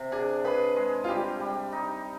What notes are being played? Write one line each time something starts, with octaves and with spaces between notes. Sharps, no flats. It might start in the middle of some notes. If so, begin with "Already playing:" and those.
Already playing: C3
D4 G#4
G#4 B4
G#3
F4
G3 G4
G3
D#4